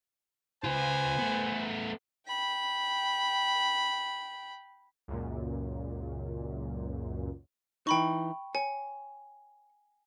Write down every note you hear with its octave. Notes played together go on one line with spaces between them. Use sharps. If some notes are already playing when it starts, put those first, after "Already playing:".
C#3 F4 B4 C5 G#5
A3 B3
G5 B5
C#2 F#2 A#2
E3 D#4 G5 B5 C#6
C#5 G#5